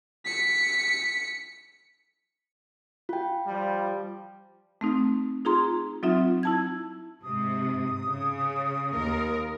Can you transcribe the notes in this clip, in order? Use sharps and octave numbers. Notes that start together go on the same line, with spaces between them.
B6 C#7
F4 G5
F3 G3
A3 C4 D#4
D#4 F4 G#4 A#5 C6
F#3 C4 D#4 F4 E5
E4 A5 G#6
G#2 C3 D#6
C#3
D#2 A#4